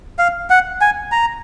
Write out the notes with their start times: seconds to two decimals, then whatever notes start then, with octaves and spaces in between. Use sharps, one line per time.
0.19 F5
0.50 F#5
0.81 G#5
1.12 A#5